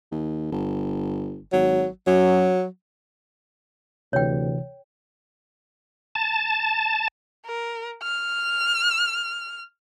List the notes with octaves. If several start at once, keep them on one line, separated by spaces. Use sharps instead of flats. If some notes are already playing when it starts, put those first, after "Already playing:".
D#2
G1
G#1 F#3
F#2 F#3
D2 C3 E3 C#5 G5
A5
A#4
F6